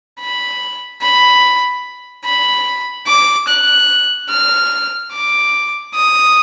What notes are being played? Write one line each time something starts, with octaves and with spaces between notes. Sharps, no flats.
B5
B5
B5
D6
F#6
F6
D6
D#6